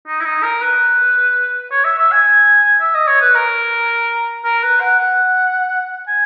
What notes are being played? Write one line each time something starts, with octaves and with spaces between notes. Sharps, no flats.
D#4
E4
D#4
A#4
B4
C#5
E5
E5
G#5
E5
D#5
C#5
B4
A#4
A#4
B4
F#5
F#5
G#5